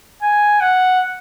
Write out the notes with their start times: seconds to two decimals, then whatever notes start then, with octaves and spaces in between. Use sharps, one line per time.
0.22 G#5
0.60 F#5